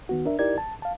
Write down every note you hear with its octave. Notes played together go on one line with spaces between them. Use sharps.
D#3 B3 F#4
D4 A#4 E5
D#4 E4 G4 A#4 D5 G#6
A5
F5 A5